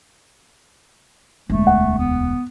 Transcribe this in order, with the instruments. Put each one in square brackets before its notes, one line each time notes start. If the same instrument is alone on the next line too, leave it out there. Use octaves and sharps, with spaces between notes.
[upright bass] E1 D2 [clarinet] A3
[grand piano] F#5
[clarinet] B3